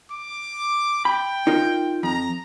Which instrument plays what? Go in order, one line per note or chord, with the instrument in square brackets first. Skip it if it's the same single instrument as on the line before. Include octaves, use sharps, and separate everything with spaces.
[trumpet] D6
[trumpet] G5 [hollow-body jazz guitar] B5
[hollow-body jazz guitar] D#4 F4 A#4
[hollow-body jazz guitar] F2 [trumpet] A#5